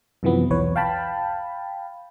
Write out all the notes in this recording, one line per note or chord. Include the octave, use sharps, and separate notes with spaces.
F#2 C3 E3 F3 B3
B1 E2 E3 B4 C#5
F5 G5 A5 B5